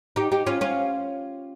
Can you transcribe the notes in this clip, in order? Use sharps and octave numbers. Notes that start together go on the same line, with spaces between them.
D#4 G4
D#4 G4
C#4 F4
C#4 F4